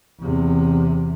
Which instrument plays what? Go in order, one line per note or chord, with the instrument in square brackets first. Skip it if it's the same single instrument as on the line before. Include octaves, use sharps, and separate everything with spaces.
[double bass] E2 C3